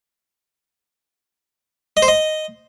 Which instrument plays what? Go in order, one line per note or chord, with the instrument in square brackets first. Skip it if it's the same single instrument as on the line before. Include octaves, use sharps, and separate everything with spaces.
[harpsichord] D#5
C5
D#5